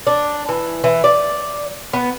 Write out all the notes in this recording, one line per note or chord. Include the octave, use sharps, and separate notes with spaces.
D4
E3
E3
D5
B3